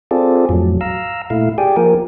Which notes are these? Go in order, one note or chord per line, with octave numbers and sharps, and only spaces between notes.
C4 F4 G#4 A4 D5
F2 A2 F#3
F5 A#5 E6
A#2 A3 E4 F5
G4 G#4 D5 G5 G#5
F3 A#3 A#4